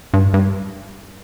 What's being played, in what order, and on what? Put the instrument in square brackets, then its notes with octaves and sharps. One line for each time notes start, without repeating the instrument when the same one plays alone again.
[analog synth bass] G2
G2